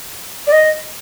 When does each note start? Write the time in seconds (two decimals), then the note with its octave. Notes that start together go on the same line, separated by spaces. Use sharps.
0.47 D5
0.52 D#5